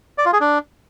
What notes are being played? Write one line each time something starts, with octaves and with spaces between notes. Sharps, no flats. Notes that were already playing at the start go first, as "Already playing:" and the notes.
D5
F4
G#4
D4